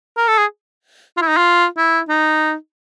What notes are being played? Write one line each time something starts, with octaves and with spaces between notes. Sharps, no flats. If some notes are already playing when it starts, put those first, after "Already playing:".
A#4
A4
G#4
F4
E4
D#4
F4
E4
D#4